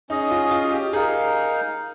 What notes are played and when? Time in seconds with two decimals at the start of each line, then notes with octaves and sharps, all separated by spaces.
0.09 C#4 D#4 G#4 D#5
0.31 F4
0.51 F4
0.72 G4
0.93 D#4 G#4 A#4 F5